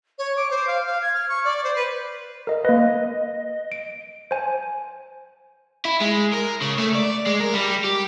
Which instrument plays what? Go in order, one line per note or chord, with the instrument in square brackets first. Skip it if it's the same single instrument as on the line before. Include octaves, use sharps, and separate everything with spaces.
[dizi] C#5
D6
C5
F5
F5
G#6
F6
C#6
D5
C5
B4
[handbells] A#4 D#5
[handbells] A#3 B4 [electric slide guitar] D#5
[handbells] D7
C5 G#5
[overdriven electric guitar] E4
G#3
A#4
C#3
A3
D5
G#3
A#4
G3
G4